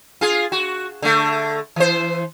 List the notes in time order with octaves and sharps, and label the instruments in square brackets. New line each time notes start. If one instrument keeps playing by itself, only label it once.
[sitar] F4 G#4
F#4
D3 A3
E3 C5